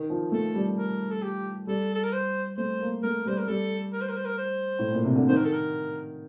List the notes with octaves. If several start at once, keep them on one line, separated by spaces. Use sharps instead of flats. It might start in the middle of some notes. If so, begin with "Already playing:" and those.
Already playing: D#3
F3
A3 A4
G3
A#4
A4
G4
G3 A4
A4
A#4
C5
A3 C5
A#3
A3 A#4
G3 C5
A#4
G3 A4
A#4
C5
A#4
C5
A#4
C5
A2
A#2
C3
D3
D#3 C5
A#4
A4
A#4